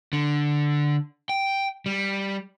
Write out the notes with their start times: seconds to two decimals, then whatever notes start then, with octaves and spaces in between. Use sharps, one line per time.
0.13 D3
1.29 G5
1.86 G3